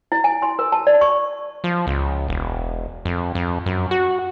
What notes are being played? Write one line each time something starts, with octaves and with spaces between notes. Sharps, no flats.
E4
G#5
C6
A#4
A5
D5
C#6
F3
C#2
E1
F2
F2
F#2
F#4